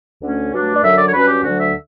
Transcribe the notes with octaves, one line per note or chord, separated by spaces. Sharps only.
D2 D3 A3 C#4
G2 F#3 A3 D4
D5
F#2 D3 F#3 E5
D5
C#5
G2 F#3 C#4 B4
G4
D2 D3 F#3 F#4
E5